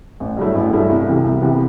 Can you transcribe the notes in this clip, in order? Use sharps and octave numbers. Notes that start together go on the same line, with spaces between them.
A1
G2 F#3 A3 E4
A1
G2 F#3 A3 E4
C2
C3 E3 B3
C2
C3 E3 B3